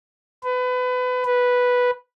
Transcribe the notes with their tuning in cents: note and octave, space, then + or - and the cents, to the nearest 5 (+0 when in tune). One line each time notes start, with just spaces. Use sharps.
B4 +25
B4 -5